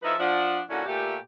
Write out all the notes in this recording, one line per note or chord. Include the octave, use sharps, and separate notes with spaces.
F3 D#4 E4 A4 B4 E5
F3 D4 F#5
A#2 D3 C#4 D4 E4 F#4
A#2 A3 G4